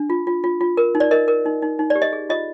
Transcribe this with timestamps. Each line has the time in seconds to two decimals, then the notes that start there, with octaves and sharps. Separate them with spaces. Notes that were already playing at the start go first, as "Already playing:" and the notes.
Already playing: D4
0.10 F4
0.27 F4
0.44 F4
0.61 F4
0.77 A#4
0.95 D#4
1.00 D5
1.11 A#4 D#5
1.28 A#4
1.46 D#4
1.62 D#4
1.79 D#4
1.90 D5
1.95 G4
2.02 D#5
2.13 G#4
2.29 F4 D#5